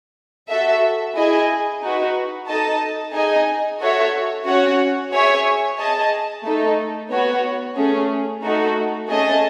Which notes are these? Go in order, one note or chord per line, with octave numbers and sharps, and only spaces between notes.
F#4 A4 E5
E4 G#4 D#5 G#5
D#4 F#4 B4
D#4 A4 D#5 A5
D#4 G#4 D#5 G#5
F#4 A4 C#5 E5
C#4 F#4 C#5 F#5
G#4 C#5 E5 G#5
G#4 D#5 A5
A3 D#4 A4
B3 F#4 C#5
A3 C#4 G#4
A3 D#4 F#4 A4
A3 C#4 G#4 D#5 A5